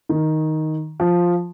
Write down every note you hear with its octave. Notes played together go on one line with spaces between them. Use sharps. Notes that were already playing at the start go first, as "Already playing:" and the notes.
D#3
F3